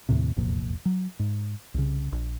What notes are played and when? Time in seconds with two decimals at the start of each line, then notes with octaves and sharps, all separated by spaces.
0.09 D#2 A2 C3
0.36 E1 C2 F2 A#2
0.85 F#3
1.19 G#2
1.74 C2 C#3
2.12 A#1